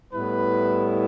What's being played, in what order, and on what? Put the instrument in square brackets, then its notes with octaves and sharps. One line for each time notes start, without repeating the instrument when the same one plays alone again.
[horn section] A2 G3 B3 E4 B4